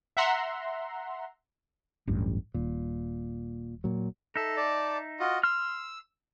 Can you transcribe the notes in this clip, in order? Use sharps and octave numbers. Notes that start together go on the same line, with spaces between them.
E5 F#5 A#5 C6
D1 A1 G2
D#1 A#2
A#2 F#3
D#4 A4 E5
D5 A5
F4 F#4 D#5
C6 E6 F6